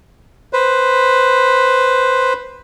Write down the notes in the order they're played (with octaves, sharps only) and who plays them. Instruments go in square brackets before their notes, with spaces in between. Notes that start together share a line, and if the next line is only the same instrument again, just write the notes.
[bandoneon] B4 C5